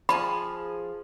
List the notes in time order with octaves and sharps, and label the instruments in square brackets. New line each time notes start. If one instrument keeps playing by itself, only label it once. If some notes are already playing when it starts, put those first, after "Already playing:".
[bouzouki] F3 G#4 A5 [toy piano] B5